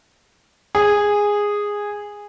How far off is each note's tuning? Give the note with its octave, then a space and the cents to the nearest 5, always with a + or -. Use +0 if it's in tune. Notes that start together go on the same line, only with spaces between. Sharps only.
G#4 -10